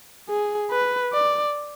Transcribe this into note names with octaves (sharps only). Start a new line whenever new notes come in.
G#4
B4
D5